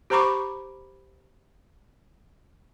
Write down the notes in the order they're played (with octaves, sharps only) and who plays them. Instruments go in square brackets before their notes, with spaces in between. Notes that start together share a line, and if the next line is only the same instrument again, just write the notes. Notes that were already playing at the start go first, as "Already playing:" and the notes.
[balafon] G4 C5 A#5 B5 C#6 D6